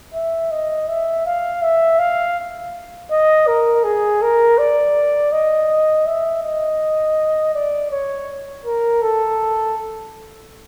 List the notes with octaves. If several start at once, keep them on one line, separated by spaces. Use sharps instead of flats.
E5
D#5
E5
F5
E5
F5
D#5
A#4
G#4
A#4
D5
D#5
E5
D#5
D5
C#5
A#4
A4